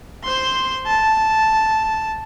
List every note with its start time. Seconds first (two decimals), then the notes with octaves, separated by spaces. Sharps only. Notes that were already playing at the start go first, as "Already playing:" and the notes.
0.24 C5 C6
0.87 A5